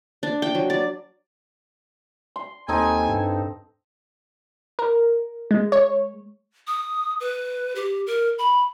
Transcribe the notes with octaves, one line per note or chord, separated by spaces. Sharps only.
D4
G5
F#3
D5
C6
D#2 C4 D#4 A4 G#5
G2
A#4
G#3
C#5
D#6
B4
G4
A#4
B5